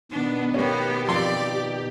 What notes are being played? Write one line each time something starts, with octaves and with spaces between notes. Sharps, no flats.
B2 D#3 B3 D4
A#3 B3 C#4 G4
F2 D5 C6